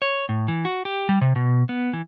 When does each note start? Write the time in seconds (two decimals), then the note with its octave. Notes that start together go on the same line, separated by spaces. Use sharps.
0.02 C#5
0.29 A2
0.48 E3
0.65 F#4
0.85 G4
1.09 G3
1.21 C3
1.36 B2
1.69 B3
1.93 E3